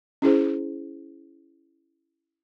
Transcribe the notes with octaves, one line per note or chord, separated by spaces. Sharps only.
C#4 E4 G#4 C5